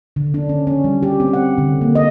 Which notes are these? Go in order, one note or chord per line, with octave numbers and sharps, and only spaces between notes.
D3
D4
C#4
C#4
G3
G4
C4
F#5
D3
A#3
D#5